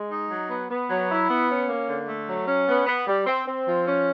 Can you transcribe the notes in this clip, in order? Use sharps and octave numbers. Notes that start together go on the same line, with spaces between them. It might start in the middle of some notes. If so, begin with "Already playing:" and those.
Already playing: G#3
D#4
F#3
B3
B3
F#3
E4
B3
C#4
A#3
D3
A3
F#3
C#4
B3
B3
G3
C4
C4
F3
C#4